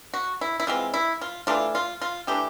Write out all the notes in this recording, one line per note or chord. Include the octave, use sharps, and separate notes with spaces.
F#4
E4
E4
E3 G#3 C4 F4
E4
F4
E3 A3 D4 F4
F4
F4
E3 A3 D4 G4